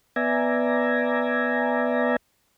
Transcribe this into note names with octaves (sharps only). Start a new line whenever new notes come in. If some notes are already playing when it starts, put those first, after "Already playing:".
B3 D5 E5 G#5 A#5